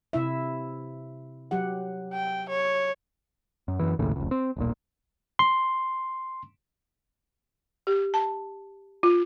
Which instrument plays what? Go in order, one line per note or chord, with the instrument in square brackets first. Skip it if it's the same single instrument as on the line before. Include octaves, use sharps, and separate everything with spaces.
[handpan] C3 E4 E5
F#3 G4 F#5
[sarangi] G5
C#5
[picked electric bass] F#2
F#2 E3
A#1 D#2 A2 C#3
F1 C#2
C4
D#1 B1 A#2
[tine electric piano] C6
[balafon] G4
A5
F4